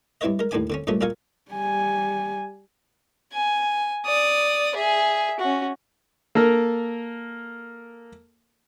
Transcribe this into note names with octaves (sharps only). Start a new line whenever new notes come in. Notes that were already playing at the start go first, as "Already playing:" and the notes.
G2 C4 E4 B4 C#5 D#5
G#3 A#4
D#2 A2 D#3 D4 G#5 D6
D3 C4 C#4
G2 A#2 G#3 A3 C#4
B1 A#2 A#4 F5 G#5 C#6
G3 G#5
G#5
D5 D#6
G#4 E5
C#4 F#4
A#3 A4 A#4